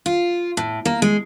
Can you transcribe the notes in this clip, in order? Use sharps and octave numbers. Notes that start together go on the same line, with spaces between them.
F4
A2
A#3
G#3